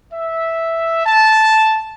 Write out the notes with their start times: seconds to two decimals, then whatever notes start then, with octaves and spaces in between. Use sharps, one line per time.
0.12 E5
1.05 A5